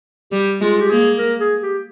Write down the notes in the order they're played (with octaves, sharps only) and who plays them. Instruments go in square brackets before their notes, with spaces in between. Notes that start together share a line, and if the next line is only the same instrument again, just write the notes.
[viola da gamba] G3 [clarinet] G4
[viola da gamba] G#3 [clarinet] F4
[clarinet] G4
[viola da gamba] A#3 [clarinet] G#4
[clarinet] A#4
G#4
G4